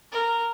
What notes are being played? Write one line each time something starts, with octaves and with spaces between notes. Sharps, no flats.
A#4